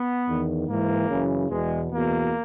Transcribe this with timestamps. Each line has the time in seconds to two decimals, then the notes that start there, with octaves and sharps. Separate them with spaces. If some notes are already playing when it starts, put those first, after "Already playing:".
Already playing: B3
0.26 E2 D#3
0.66 G#2 E3 A#3
1.07 F#2 C#3 E3
1.49 E2 B2 G#3
1.90 E2 B2 A#3